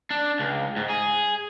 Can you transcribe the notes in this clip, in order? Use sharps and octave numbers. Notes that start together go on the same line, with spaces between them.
D4
C#2
G#2
G#4